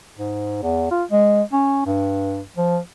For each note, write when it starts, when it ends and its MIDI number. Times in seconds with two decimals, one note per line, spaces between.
0.17 0.58 44
0.63 0.88 40
0.91 1.03 65
1.11 1.42 56
1.53 1.85 61
1.86 2.42 43
2.57 2.79 53